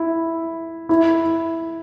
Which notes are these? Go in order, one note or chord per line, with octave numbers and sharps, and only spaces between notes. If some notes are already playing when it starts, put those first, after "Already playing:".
Already playing: E4
E4